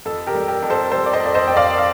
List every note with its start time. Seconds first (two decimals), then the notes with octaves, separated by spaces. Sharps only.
0.05 F2 A4
0.27 G4 A#4
0.35 G3
0.48 G4 A#4
0.62 F2
0.70 A4 C5
0.92 G3 A4 C5
1.06 D5
1.13 C5 D#5
1.20 F2
1.26 D5
1.35 C5 D#5
1.47 F2 G5
1.57 D5 F5
1.78 F5